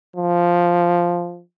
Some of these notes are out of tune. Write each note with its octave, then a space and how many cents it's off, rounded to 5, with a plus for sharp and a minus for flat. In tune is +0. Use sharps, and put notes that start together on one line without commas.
F3 +0